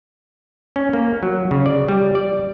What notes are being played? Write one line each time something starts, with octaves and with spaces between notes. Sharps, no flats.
C#4
A#3
F#3
C#3
D5
G3
D5